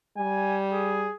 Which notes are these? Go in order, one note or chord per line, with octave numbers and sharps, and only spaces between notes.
G3 G#5
G#4